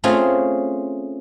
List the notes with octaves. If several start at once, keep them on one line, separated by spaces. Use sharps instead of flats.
A3 C4 C#4 F4 G#4